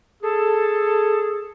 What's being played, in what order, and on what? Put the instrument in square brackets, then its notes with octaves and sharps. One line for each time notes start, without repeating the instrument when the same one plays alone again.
[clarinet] G#4 [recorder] A4